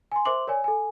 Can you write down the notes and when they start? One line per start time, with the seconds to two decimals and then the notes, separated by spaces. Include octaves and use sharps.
0.12 G#5 C6
0.25 A#4 C5 E5 C6 D6 F#7
0.47 A#4 C#5 D5 G#5
0.64 A4 G#5